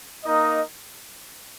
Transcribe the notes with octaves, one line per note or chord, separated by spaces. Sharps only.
A#3 D#4 A#4 D#5